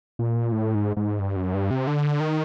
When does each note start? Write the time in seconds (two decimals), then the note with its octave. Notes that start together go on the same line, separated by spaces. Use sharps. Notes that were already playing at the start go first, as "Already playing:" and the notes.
0.19 A#2
0.52 A2
0.75 G#2
0.97 G#2
1.20 G2
1.36 F#2
1.54 G2
1.71 C3
1.87 D3
2.20 D#3